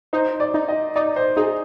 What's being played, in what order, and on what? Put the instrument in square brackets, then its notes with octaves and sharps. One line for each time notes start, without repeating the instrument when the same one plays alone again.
[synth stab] D#4 [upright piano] C5
[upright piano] D5
[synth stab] D#4
[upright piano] D#5
[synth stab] D#4 [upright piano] D5
[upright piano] C5
[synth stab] D#4 [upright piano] G#4